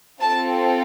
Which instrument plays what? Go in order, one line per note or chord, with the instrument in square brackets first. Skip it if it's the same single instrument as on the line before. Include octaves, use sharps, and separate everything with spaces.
[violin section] C4 F4 A4 A5